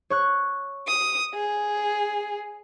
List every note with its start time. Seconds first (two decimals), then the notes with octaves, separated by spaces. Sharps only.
0.10 C#5 C#6 F#6
0.88 D#6
1.34 G#4